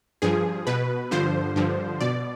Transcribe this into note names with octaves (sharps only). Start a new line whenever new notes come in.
G2 F3 G#4
B2 B4
G2 D3 F3 C5
G2 D3 F3
B2 D5